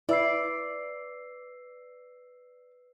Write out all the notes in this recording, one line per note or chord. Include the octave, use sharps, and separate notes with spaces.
E4 B4 D5 E6 C7